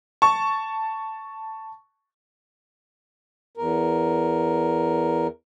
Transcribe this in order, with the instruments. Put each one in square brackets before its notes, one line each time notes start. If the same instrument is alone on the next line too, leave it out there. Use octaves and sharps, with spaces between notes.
[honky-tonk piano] A5 C#6
[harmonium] E2 A#4